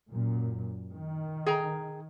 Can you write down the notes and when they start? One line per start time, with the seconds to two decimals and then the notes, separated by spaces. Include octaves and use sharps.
0.11 F#2 A#2
0.94 D#3
1.46 G#4 G5 A#5